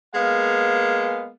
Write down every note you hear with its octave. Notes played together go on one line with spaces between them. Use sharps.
G#3 A#3 B3 F5